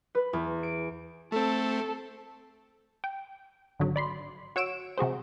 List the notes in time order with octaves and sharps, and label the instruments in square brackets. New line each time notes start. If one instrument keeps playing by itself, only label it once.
[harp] B4
E2
D7
[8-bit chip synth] A3 C4 [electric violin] A4
[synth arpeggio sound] G5
G#1 D3 F#3
D5 B5 C6
F#4 C#5 E6 D7 E7
C3 F#4 G#4 C5